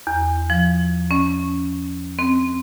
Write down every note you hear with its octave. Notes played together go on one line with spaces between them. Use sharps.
E2
F3
C#4
C4